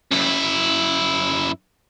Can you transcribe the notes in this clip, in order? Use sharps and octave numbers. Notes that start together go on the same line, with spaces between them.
F#2 E4